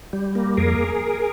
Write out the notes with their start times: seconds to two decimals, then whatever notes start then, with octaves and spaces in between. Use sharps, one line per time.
0.13 G3
0.35 A#3
0.57 F2 G#4 A#4